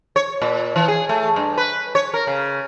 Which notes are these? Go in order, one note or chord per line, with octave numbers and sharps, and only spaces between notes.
C#5
A#2
E3
G#4
A3
G2
B4
C#5
A#4
C#3